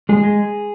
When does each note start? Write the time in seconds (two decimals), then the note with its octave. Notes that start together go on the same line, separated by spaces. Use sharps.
0.09 G#3 G#4
0.24 G#3